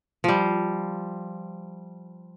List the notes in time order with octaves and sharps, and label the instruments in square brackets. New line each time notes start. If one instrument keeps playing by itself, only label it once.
[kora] F3 G3